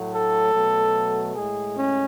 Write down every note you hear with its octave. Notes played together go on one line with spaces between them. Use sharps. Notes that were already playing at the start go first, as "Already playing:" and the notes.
Already playing: A2 F#3 A3
A4
B2 F#3 A3
A2 G#3 G#4
C#4